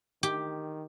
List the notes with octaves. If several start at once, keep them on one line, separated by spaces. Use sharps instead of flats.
D#3 G4